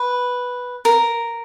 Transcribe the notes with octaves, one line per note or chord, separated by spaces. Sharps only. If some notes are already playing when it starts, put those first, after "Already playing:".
Already playing: B4
A#4